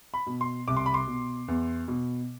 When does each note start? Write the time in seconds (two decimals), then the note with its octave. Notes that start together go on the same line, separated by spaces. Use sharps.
0.14 B5
0.27 B2
0.41 C6
0.68 C2 D6
0.77 C6
0.86 B5
0.94 C6
1.07 B2
1.48 E2
1.88 B2